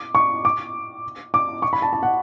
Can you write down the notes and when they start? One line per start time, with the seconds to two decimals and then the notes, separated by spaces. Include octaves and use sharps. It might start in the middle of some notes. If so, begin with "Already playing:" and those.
Already playing: D6
0.15 C#6
0.45 D6
1.34 D6
1.62 C#6
1.73 B5
1.82 A5
1.93 A5
2.03 F#5